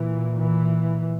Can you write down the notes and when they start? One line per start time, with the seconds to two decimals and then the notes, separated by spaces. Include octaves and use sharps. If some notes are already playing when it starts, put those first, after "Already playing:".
Already playing: A#2 E3
0.40 E3